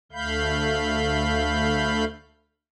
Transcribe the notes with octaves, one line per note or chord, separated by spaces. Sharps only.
D2 A3 F5 B5 G6